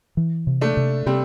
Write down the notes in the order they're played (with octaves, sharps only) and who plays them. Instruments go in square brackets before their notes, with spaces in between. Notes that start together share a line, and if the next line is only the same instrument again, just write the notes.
[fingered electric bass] E3
C3
[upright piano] A3 D4
[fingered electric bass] C3
[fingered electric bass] C3 [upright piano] G3 C4